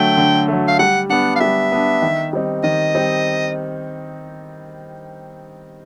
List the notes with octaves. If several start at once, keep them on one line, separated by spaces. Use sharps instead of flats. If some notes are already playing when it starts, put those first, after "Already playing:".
Already playing: D3 F#3 A3 G5
D3
F#3 A3
F5
G3 F#5
B3 D4 F#5
F5
G3 E5
B3 D4
D#3
G3 C4 D#4
D#3 D#5
G3 C4 D#4